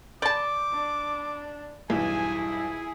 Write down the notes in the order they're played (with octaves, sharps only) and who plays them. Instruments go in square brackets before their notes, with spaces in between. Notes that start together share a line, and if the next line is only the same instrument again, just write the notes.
[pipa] D5 A5 [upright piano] B5 C6 G6 [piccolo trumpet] D6
[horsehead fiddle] D4
[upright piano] B1 E2 G2 [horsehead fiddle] E4 G#4 [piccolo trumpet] G#5
[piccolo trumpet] G#5